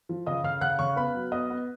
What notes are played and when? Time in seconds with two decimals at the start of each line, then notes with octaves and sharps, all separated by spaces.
0.09 F3
0.26 C#3 D#5 D#6
0.44 C#3 F5 F6
0.61 C#3 F#5 F#6
0.79 C#3 C#5 C#6
0.96 B3 B4 B5
1.14 F#3
1.32 B3 D#5 D#6
1.50 B3